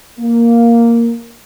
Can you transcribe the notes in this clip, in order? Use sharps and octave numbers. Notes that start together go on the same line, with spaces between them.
A#3